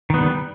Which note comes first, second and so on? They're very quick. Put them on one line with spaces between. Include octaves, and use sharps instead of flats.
D#3 B3 G3